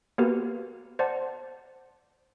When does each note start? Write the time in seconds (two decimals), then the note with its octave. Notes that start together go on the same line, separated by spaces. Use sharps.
0.18 A#3 B3 F#4 G4 A#4 B4
0.99 C5 D5 F#5 A5